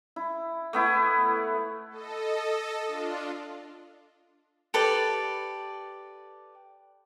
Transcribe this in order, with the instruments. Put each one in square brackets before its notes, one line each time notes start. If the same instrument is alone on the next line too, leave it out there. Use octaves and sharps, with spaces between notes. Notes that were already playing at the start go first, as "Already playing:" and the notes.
[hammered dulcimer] E4
A3 B3 E4
[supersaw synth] A4 D#5
D4 F4
[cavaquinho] G4 A4 B4 D5